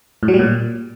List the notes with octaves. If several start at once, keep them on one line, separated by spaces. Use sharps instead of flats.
A2
F#3
G3
A#2